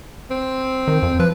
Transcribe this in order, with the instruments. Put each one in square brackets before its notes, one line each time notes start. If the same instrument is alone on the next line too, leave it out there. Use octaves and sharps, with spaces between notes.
[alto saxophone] C4
[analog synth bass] D#3
F2
[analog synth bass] F3 [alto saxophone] B4